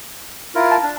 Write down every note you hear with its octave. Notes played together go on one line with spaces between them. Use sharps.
E4 F4 A#4
A5
D4